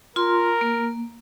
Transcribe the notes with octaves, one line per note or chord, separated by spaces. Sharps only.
F4 A#4 C6
A#3